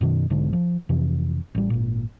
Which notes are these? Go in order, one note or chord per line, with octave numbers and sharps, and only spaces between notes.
F#2 B2 D#3
E1 B1 G#2 D3
F3
F2 C3 E3
A1 G3
G#1 A#2